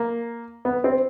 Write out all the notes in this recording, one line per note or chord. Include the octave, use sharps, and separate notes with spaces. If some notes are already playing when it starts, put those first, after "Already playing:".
Already playing: A#3
B3
C4